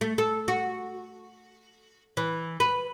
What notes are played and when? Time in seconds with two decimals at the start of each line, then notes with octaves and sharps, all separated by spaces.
0.01 A3
0.18 A4
0.48 F#4
2.17 E3
2.60 B4